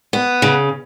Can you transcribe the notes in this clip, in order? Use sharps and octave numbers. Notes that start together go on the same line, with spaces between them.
B3
C#3